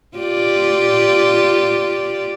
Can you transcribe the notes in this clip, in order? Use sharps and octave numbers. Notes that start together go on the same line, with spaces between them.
F4 G4 D5